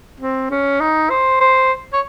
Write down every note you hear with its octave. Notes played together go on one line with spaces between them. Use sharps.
C4
C#4
D#4
C5
C5
C#5